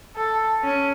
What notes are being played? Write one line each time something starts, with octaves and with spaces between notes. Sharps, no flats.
A4
C#4